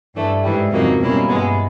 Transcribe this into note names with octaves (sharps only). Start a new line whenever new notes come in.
G2 E3 A3 D4
G#2 E3 G3
F2 C#3 F#3 A#3 D#4
B2 G3 A#3 C#4 E4
G2 E3 G#3 B3